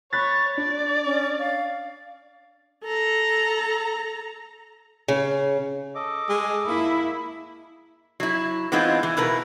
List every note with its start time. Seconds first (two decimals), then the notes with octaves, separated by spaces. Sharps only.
0.13 C#5 B5 F#6 A6 B6
0.57 D4 D5
1.05 C#4
1.40 F5
2.84 A4 A#5
5.08 C#3
5.95 A4 D#5 D6
6.29 G#3
6.68 A#3 E4
8.20 F#3 E4
8.72 E3 G#3 B3 C4 D#4 F4
9.03 E3
9.17 B2 E4 A#4 B4